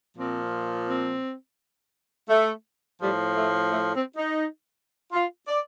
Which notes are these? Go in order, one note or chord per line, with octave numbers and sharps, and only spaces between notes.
A#2 F3 C4
C4
A3
A2 F3 G3
A3
A3
C4
D#4
F4
D5